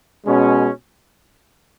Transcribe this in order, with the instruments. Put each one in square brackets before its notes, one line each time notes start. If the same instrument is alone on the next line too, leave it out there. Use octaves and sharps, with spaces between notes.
[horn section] B2 G#3 C#4